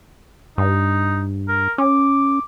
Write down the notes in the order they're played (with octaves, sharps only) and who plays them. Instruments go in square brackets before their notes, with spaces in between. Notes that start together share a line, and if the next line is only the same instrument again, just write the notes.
[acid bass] G2 [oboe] D#4
[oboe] A#4
[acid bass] C#4 [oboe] D6